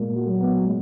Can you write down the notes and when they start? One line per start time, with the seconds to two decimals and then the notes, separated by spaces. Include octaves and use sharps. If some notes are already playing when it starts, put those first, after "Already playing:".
Already playing: A#2 G#3 A#3
0.15 F#4
0.27 F#3
0.40 B3
0.66 G#3